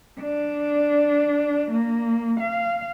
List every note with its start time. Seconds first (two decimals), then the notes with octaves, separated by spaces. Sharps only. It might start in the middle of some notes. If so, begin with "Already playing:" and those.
0.21 D4
1.71 A#3
2.40 F5